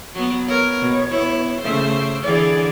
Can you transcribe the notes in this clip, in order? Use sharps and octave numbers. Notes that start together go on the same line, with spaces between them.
F#3 B3
B3 A#4 C#5
B2
E4
C#3 A3 C5 E5
D3 E3 G#4 D5